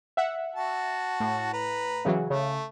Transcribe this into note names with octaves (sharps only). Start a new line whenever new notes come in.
E5 F#5
F#4 A5
A2
B4 A#5
C#3 E3 F#3
C#3 A3